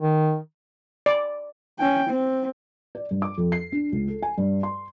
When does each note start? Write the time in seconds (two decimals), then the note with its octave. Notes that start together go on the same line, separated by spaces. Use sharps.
0.02 D#3
1.06 D5
1.79 C#4 G5
2.09 C4
2.95 D5
3.11 G2
3.22 D6
3.38 F2
3.52 C7
3.72 D4
3.92 C#2
4.08 A4
4.22 G#5
4.38 G2
4.63 C6